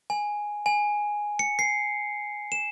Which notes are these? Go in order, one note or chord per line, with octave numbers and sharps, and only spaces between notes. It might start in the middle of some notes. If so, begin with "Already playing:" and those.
G#5
G#5
C#7
C7
E7